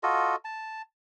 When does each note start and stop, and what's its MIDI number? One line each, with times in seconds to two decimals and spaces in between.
0.03 0.36 65
0.03 0.36 66
0.03 0.36 69
0.03 0.36 75
0.45 0.82 81